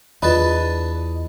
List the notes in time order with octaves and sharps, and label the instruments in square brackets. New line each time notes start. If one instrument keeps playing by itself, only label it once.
[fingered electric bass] E2 [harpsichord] D4 B4 A5 [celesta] F4 B5 [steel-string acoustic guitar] D#5